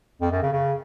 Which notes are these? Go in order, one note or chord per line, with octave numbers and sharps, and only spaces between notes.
F2
F#2
C#3
C#3